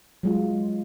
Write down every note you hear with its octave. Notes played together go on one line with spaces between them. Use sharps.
F#3 G#3 F4